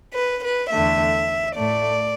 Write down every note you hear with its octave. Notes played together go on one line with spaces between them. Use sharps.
B4
B4
E2 D3 A3 E5
A2 A3 D5